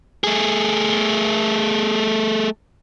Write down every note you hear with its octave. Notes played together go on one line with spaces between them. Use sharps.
A3 G#4